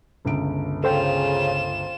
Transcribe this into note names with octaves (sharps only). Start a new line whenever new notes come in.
G1 C#2 D7
C#3 F4 A4 C5 G5 E7